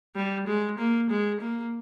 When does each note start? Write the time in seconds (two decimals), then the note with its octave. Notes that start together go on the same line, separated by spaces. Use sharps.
0.16 G3
0.47 G#3
0.78 A#3
1.10 G#3
1.41 A#3